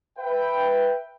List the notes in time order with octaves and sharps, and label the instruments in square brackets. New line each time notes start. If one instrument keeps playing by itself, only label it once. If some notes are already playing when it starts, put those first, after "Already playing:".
[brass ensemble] B4 E5 G5